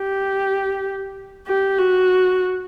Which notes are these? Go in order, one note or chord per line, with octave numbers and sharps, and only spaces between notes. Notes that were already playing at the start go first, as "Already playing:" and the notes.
Already playing: G4
G4
F#4